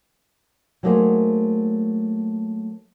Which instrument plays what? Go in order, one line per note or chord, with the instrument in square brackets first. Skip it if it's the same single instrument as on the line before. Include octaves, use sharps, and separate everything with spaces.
[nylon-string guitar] F#3 A3 A#3 D#4 G#4 C5